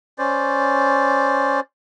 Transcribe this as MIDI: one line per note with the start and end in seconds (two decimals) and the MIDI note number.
0.18 1.60 61
0.18 1.60 72
0.18 1.60 74